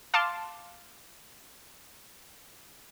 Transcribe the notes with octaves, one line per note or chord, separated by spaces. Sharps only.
F5 A5 C6 D6